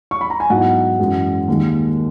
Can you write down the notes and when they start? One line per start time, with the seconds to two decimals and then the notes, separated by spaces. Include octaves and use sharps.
0.11 C#6
0.21 B5
0.30 A#5
0.40 G#5
0.50 G#2 F#3 B3 E4 F#5
0.99 F#2 E3 G#3
1.48 D#2 D#3 G#3